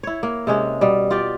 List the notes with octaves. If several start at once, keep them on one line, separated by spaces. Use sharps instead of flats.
E4 C#5
A#3
C3 G#3 C#4
B2 G3
F4 G4 D5